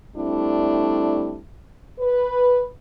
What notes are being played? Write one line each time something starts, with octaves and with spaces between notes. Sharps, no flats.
G3 A3 C4 D4 E4
B4